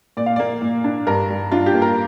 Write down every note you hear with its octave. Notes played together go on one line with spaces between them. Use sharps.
A#2 D5
F5
A#3 D5
A#2
D4
G2 A#4
G3
D4 F4
G4
A#3
A#4